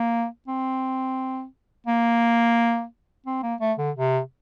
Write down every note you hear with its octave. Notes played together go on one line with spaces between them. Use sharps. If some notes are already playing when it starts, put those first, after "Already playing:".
Already playing: A#3
C4
A#3
C4
A#3
A3
D3
C3